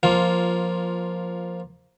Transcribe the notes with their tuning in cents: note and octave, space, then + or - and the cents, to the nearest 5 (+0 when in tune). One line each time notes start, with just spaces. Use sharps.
F3 +10 A#3 +10 F4 +0